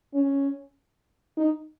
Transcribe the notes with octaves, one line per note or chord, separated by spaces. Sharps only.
C#4
D#4